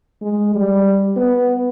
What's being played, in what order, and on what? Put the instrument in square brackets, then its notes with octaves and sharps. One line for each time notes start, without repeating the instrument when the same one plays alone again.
[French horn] G#3
G3
B3